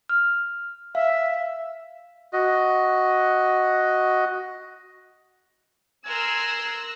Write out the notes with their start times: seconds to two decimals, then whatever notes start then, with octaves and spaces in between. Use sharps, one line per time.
0.09 F6
0.95 E5 F5
2.33 F#4 D#5
6.05 A#4 G#5 C6 E6 F#6 A#6